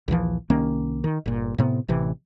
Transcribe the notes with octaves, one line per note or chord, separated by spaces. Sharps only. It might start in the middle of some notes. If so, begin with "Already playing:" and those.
A#1 D#2 E3 F3
C2 D#3 A#3 C#4
D#3
G1 A#2
A2 C3 B3
A1 C3 E3